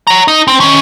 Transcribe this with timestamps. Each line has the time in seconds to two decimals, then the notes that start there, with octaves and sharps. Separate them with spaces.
0.07 C#5 A#5
0.28 D#4
0.47 C4
0.60 D#3 C#4